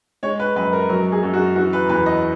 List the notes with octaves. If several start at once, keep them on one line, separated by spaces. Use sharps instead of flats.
G#3 C#5
B4
F#2 B4
A#4
F#3 A#4
G#4
F#2
F#4
E3 F#4
B4
E2 B4
D#5